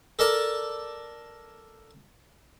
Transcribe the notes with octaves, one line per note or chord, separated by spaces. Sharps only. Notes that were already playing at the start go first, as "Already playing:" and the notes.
A4 A#4 D5 A5